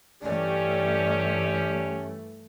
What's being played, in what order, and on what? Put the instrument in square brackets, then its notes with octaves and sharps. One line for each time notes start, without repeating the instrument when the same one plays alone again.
[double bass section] G2 E3 A3 [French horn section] C#4 G4 [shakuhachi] D5